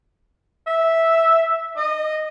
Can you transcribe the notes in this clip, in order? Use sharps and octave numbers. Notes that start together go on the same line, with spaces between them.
E5
D#5